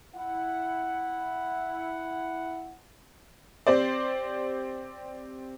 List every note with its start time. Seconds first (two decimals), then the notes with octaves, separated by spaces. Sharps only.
0.15 E4 F#5
3.67 C4 G4 C5 D5